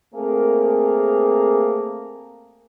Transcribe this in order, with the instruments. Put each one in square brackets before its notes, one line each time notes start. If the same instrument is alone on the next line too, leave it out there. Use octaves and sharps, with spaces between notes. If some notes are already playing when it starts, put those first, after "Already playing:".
[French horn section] A3 A#3 C4 G#4 A#4